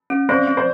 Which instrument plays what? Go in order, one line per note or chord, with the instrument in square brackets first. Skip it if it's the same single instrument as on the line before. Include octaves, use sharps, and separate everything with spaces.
[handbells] C#4
[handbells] C4 [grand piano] C5 D5
[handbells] C4
[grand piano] C5 D5